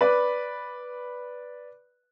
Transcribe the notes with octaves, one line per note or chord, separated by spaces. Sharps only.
B4 D5 B5 F#6